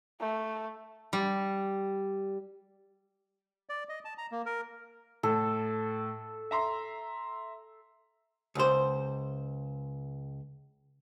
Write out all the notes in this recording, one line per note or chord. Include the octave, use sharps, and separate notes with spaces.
A3
G3
D5
D#5
A5
A#5
A#3
A#4
A2 A4
E5 A#5 C6
C#2 C5